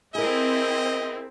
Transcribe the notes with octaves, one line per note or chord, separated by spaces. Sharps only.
C4 E4 G#4 A#4 D#5